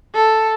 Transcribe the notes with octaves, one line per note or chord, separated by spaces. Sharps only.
A4